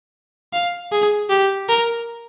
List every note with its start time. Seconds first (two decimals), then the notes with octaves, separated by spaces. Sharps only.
0.53 F5
0.92 G#4
1.30 G4
1.69 A#4